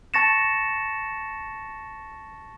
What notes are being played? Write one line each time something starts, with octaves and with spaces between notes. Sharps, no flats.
A5 C#6 A6 A#6 C#7 E7